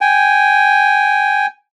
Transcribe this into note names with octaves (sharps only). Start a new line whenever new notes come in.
G5 G#5